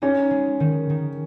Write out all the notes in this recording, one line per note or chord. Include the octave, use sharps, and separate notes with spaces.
C#4 D#4
G#3
D#3
D#3